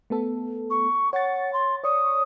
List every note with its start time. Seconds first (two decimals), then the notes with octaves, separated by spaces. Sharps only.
0.10 A3 B3 A4
0.70 C#6
1.13 C#5 F#5 A6
1.53 C6
1.84 C#5 D5 C#6 D#6